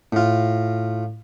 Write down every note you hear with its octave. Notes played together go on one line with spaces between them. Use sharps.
A2 F4